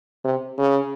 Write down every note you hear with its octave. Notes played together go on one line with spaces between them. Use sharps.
C3
C#3